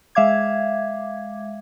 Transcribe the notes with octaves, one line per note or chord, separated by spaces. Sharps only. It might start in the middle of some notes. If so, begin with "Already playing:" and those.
G#3 E5 F5 D6 G#6